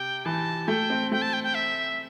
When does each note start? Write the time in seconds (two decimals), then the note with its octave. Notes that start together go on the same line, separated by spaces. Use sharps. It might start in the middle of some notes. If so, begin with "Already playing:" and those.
Already playing: C3 G5
0.25 E3 A5
0.68 A3 G5
0.90 C4
1.12 A3 G5
1.22 A5
1.33 G5
1.44 G5
1.54 E5